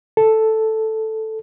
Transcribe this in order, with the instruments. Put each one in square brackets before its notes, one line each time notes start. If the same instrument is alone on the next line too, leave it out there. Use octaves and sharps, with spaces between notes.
[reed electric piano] A4